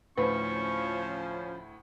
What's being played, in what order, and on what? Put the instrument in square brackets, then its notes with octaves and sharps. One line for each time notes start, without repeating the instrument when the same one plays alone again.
[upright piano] D2 A2 [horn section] F3 C#4 [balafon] B4 C5 [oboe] C#6